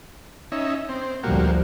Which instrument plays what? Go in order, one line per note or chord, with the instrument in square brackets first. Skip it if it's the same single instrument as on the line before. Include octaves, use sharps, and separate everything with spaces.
[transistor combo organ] C#4 D#4 E5
C4
[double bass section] D2 F3 G3 [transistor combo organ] A#3 F#4 G4